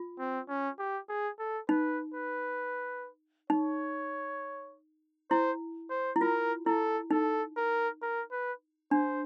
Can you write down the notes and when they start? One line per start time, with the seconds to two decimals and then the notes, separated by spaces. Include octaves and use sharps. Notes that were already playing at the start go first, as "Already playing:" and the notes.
Already playing: F4
0.19 C4
0.48 C#4
0.78 G4
1.09 G#4
1.39 A4
1.69 D#4 B4
2.14 B4
3.50 D#4 C#5
5.30 E4 C5
5.90 C5
6.16 E4
6.21 F4 A#4
6.66 E4 A4
7.11 D#4 A4
7.57 A#4
8.02 A#4
8.31 B4
8.91 D4 C5